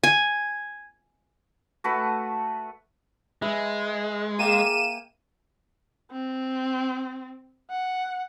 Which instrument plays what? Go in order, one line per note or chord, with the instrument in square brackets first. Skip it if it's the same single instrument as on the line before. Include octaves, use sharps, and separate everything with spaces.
[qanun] G#5
[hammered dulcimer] A3 F#4 A4 B4
[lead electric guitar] G#3 [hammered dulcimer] G#4 B4 E5
[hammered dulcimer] A#3 G5 [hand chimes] G#4 F5 [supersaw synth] D#7 E7
[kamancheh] C4
F#5